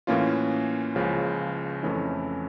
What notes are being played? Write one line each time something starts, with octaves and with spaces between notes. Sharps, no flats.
A2 E3 A#3 C#4 F4
C#2 C#3 F3 C#4
F2 E3 A3 C#4 E4